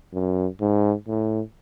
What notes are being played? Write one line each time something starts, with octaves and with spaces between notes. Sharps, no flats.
F#2
G#2
A2